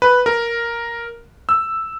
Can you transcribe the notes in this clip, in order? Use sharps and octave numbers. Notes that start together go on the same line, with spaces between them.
B4
A#4
E6